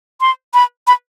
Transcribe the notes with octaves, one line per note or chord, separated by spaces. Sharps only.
C6
B5
B5